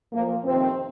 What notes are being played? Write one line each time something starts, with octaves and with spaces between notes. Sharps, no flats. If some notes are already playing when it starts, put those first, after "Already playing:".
A#2 F3 A#3
F2 C3 D#3 C4